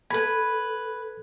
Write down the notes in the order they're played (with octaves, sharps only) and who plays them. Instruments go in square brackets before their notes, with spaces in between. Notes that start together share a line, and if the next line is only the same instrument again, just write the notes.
[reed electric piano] A4 G#6 [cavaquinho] B4 B5